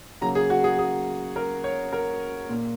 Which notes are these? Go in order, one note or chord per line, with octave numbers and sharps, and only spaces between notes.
C#3 F#3 A#3 A#5
G#4
F#4
G#4
G#4
A#4
C#5
A#4
A#2 A#3